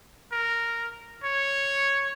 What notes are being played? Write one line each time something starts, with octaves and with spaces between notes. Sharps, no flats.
A#4
C#5